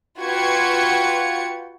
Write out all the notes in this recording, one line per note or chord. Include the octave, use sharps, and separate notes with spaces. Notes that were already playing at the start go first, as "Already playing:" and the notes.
F4 F#4 B4 G5 G#6 C#7